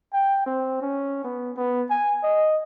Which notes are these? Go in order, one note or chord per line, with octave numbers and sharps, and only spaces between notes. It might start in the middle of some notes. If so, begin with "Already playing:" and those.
G5
C4
C#4
B3
B3
G#5
D#5